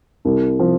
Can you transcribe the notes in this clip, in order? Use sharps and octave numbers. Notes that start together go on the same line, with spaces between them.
C2
C3 F3